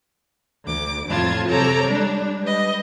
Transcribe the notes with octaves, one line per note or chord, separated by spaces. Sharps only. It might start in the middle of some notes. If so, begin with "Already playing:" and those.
D2 D6
F2 A2 F4 A5 G#6
C3 F#3 A4 C#5 A#5 D6
G3 G#3 D4
G3 B4 D#5